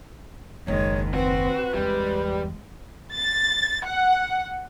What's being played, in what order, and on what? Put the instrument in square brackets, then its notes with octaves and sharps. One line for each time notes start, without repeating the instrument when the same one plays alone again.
[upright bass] F#1 D#2 [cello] D#3 G#3 [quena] C#5
[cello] C4 [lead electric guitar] F#4 [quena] B4
[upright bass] G1 E2 [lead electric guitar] G3 [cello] G#3
[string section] A6
F#5